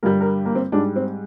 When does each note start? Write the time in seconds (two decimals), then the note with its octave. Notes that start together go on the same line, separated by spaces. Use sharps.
0.03 G2 D3 G3 A#4
0.21 A#4
0.45 A#3
0.55 C4
0.72 G#2 G3 D4
0.96 C4